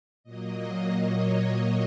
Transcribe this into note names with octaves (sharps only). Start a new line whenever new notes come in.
A#2 F#3 A#3 D#5
C#5